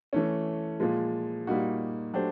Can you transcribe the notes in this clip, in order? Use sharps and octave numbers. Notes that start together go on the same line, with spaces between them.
E3 A3 C#4
A#2 F3 G#3
A#2 G3 A#3 D#4 F#4
F#3 A3 D4 G4 C5